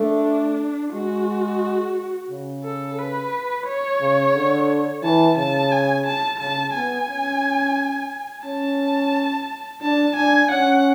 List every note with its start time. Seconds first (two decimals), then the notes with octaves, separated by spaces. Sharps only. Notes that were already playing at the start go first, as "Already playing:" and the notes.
Already playing: A3 D4
0.93 G#3 F#4
2.31 C#3
2.64 A4
2.98 B4
3.66 C#5
4.01 C#3
4.35 D3
5.03 E3 A5
5.37 C#3 A5
5.72 G#5
6.06 A5
6.40 C#3 A5
6.74 B3 G#5
7.09 C#4
8.45 C#4 A5
9.82 D4 A5
10.16 D4 G#5
10.50 C#4 F#5